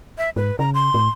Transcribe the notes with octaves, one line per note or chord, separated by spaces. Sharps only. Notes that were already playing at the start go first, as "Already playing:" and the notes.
E5
G#2 B4
C#3 A#5
C6
A2